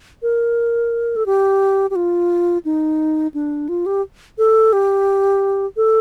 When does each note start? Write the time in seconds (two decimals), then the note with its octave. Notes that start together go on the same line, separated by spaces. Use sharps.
0.22 A#4
1.16 A4
1.26 G4
1.90 G4
1.96 F4
2.65 D#4
3.34 D4
3.69 F4
3.86 G4
4.38 A4
4.73 G4
5.77 A4